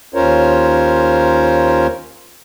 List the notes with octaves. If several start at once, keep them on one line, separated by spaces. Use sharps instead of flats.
D#2 C#4 F4 A#4 C5 C#5